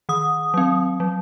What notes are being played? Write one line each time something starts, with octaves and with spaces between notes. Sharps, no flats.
D#3 D#6
F#3 C4
F#3